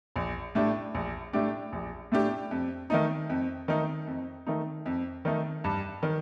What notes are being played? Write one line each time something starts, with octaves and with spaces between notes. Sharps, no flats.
A#1
A2 A3 D4 G4
A#1
A2 A3 D4 G4
A#1
A2 A3 D4 G4
F2
D#3 A3 D#4
F2
D#3 A3 D#4
F2
D#3 A3 D#4
F2
D#3 A3 D#4
G2
D#3